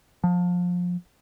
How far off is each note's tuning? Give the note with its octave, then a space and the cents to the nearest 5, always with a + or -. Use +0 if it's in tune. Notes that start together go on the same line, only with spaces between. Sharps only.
F3 +25